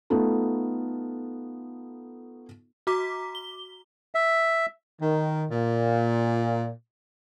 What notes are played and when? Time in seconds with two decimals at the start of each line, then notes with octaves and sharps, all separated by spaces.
0.10 A3 B3 D#4 F4 A4
2.87 F#4 A#5 D6 B6
3.35 G7
4.15 E5
5.02 D#3
5.51 A#2